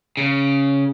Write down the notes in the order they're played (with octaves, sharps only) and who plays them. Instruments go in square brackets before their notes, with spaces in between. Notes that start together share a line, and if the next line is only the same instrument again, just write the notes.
[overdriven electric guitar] C#3